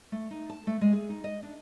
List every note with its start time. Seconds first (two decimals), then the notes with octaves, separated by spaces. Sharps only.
0.12 A3
0.31 D#4
0.49 A5
0.67 A3
0.81 G#3
0.93 G#4
1.10 D#4
1.24 D#5
1.43 D4